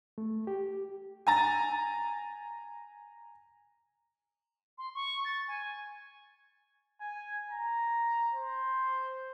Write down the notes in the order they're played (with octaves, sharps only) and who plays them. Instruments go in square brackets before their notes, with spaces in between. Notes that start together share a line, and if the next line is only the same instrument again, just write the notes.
[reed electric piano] A3
G4
[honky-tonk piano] G#5 A#5 A6
[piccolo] C6
C#6
A6
G#5
[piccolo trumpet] G#5
A#5
C5